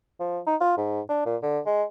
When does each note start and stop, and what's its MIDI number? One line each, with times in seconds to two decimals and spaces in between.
0.20 0.40 53
0.47 0.56 63
0.61 0.73 65
0.78 1.01 44
1.09 1.21 62
1.26 1.37 46
1.43 1.60 50
1.66 1.84 56